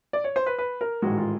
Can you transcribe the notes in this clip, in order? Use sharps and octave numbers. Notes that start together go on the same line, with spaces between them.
D5
C#5
C5
B4
B4
A#4
A1 G#2 D#3 G#3 F#4
F4